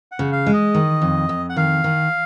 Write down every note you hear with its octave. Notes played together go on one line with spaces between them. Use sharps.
F#5
C#3
F5
G#3
D#5
D#3
F2
F2
F#5
D#3 F5
D#3